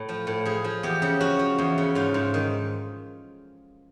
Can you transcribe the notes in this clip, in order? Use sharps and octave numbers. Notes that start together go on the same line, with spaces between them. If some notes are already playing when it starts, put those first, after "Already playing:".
Already playing: A2
F3
A2
F3 G#4
F3
E2 G4
C#3
F3 F#4
F3
E2
C#3
G#2 F4
G#2
D#3